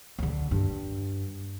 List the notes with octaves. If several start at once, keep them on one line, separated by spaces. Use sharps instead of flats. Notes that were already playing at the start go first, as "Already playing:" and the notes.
D2 D3
G2